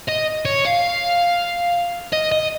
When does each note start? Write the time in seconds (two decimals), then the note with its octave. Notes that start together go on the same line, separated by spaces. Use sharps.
0.09 D#5
0.45 C#5
0.65 F5
2.13 D#5
2.32 D#5